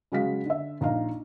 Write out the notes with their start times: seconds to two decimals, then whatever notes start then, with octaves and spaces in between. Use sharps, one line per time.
0.12 C#3 F#3 G#3 F5 B6
0.46 D3 E5
0.81 A#1 D#4 F5 A#5